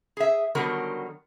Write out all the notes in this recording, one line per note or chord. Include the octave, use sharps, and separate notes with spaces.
G#4 E5
D3 D#3 F#3 G3 B3 A#4